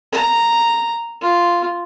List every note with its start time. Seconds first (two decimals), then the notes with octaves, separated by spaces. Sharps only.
0.12 A#5
1.22 F4